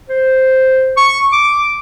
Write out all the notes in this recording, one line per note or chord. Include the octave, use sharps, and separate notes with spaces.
C5
C#6
D6